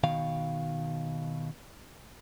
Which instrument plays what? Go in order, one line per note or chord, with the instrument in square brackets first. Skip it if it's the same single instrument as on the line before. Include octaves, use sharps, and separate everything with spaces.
[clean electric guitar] B2 D#3 F5